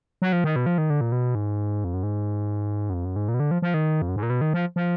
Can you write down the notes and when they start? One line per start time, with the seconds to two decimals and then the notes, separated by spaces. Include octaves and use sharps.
0.22 F#3
0.33 F3
0.44 D#3
0.56 B2
0.66 F3
0.78 D#3
0.90 D3
1.01 A#2
1.12 B2
1.35 G#2
1.84 F2
1.94 F#2
2.03 G#2
2.90 F#2
2.94 F2
3.05 F#2
3.16 G#2
3.28 A#2
3.34 B2
3.40 D3
3.51 F3
3.62 F3
3.74 D#3
4.02 F2
4.09 F#2
4.16 G#2
4.23 A#2
4.30 B2
4.41 D#3
4.54 F3
4.76 F3